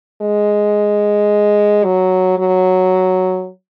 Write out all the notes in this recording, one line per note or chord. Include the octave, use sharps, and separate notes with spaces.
G#3
F#3
F#3